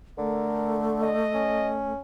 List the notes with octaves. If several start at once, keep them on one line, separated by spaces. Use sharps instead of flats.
D3 A3 A#4
D#5
C#4